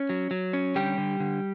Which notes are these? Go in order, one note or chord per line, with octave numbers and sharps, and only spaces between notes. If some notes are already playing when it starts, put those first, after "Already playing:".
Already playing: C#4
F#3
F#3
C#4
D3 G3 G4
D3
D3